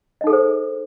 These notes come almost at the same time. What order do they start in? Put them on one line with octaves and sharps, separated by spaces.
D#5 D#4 A4 G#4 C5